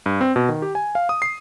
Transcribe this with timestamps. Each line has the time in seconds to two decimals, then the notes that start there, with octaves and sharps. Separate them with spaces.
0.06 G2
0.21 C4
0.36 B2
0.49 D#3
0.62 G4
0.75 G#5
0.95 F5
1.09 D#6
1.22 C7